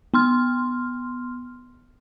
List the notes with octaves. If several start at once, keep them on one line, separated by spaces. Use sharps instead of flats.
B3 C6 F6